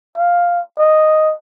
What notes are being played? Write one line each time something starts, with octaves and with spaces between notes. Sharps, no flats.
F5
D#5